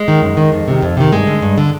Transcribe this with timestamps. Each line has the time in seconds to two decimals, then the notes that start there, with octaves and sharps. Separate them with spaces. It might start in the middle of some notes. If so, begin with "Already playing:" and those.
Already playing: G#3
0.08 D#3
0.22 F#2
0.37 D#3
0.52 F2
0.68 C3 D#3
0.82 F2
0.97 C3 D#3
1.12 G2 G#3
1.27 D3
1.42 G2
1.58 D3